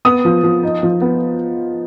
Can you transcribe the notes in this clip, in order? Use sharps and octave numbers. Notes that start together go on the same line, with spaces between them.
B3 D#6
F3
F3
D#4
F3
B3